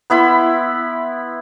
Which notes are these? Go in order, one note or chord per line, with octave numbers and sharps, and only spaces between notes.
B3 E4 B5 C6